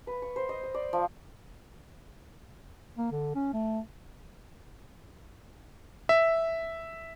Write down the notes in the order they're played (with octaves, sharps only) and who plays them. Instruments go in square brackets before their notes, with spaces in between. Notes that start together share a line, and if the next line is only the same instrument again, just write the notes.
[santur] B4
C#6
C5
D#5
D#5
D5
F3
[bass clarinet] A#3
D3
C#4
A3
[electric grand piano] E5